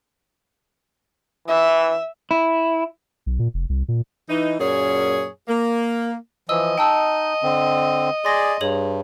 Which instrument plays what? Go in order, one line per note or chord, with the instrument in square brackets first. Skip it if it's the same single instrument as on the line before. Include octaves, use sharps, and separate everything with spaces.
[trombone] E3 [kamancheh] E5
[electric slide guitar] E4
[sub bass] B1
A#2
F1
C2
A#2
[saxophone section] E3 D#4
F#2 A#2 G#4 C#5
A#3
[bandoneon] E3 F3 [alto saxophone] D#5 [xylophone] E6
[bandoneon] D#4 [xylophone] G5 A5 E6
[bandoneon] D3 C4
[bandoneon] G#4 D5 [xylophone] C6 A#6
[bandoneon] G2 [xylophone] G#4 C#5 F#7